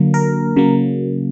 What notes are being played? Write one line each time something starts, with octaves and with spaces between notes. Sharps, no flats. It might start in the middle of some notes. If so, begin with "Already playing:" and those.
Already playing: D3 F#3 A#3
A#4
C#3 F#3 A#3